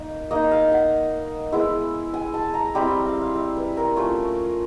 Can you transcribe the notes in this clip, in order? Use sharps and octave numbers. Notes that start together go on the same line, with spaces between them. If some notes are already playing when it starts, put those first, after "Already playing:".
Already playing: A#3 D#4
A#3 D#4 D#5
F5
F#5
G#3 B3 E4
G#5
A5
A#5
G3 C4 E4 B5
A#5
F5
F5
E5
B4
A#4
A3 C#4 F4